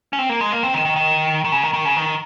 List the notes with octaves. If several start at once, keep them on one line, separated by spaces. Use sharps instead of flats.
C#4
C4
A#3
G#3
A#3
C4
D#3
D#3
D#3
D#3
C#3
D#3
D#3
C#3
D#3